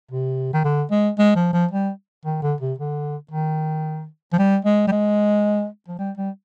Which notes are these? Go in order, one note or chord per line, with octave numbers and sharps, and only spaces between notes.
C3
D#3
D3
G#3
G#3
F3
F3
G3
D#3
D3
C3
D3
D#3
F3
G3
G#3
G3
G#3
F3
G3
G3